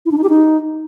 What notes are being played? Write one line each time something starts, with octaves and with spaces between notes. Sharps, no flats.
E4
D4
D#4
G4
D#4